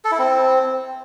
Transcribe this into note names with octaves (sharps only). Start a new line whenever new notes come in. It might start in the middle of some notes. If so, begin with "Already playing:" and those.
A4
E4
C4